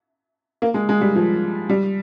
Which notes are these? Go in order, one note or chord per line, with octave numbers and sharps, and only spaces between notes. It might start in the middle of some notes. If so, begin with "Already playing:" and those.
A#3
G#3
G#3
G3
F3
G3